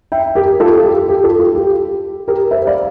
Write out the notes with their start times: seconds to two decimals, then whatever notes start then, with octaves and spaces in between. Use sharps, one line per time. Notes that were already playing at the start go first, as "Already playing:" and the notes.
0.12 E5 G5
0.35 G4 A#4
0.60 F4 A4
0.84 G4
1.08 G4
1.24 F4 A4
1.39 F4
1.55 G4
2.28 G4 A#4
2.51 C5 E5
2.67 D5 F5